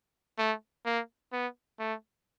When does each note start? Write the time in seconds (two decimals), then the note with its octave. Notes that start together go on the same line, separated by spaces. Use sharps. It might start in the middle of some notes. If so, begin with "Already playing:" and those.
0.38 A3
0.85 A#3
1.32 B3
1.79 A3